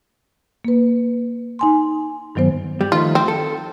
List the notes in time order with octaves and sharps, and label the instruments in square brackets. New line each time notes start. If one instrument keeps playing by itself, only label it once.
[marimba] A#3 B4
D#4 G#5 C6
G2 D#3 F#3 B3 C5
[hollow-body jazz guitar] G3
[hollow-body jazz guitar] D#3 F3 A3 [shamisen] F4
[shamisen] C4
[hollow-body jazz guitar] A4